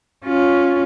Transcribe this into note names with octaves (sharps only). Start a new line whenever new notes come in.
C#4 F4